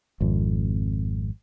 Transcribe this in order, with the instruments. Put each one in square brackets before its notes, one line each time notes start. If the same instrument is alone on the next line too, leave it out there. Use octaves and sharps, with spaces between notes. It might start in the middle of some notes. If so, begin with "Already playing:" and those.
[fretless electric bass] G#1 F2